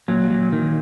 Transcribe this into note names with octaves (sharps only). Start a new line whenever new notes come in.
A#2 F#3
F#3
D#3